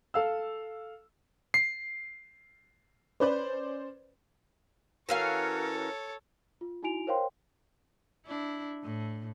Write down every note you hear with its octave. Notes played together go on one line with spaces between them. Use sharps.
A4 F5 E6
C7
C#4 B4 C5 D5
E3 C#4 F#4 A4 A#4 C#5 F5
F4
D#4 E4 F#4 G#5 D7 F7
A#4 C5 C#5 F5 G5 C6
D4 E4
A2